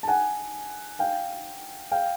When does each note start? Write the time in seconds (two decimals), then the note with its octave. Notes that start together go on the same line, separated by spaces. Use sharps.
0.03 A5
0.08 F#5 G#5
0.99 F5 G5
1.92 F5 G5